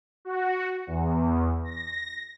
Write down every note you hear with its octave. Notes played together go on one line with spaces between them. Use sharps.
F#4
E2
A#6